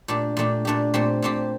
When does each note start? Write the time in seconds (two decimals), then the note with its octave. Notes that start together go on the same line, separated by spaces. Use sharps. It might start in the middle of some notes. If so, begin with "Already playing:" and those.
0.08 A#2 A3 D4 G4
0.37 A#2 A3 D4 G4
0.65 A#2 A3 D4 G4
0.94 A#2 A3 C4 G4
1.22 A#2 A3 C4 G4